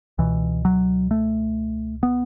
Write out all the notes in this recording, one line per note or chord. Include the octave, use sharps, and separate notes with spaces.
C#2 B2 E3
F#3
A3
B3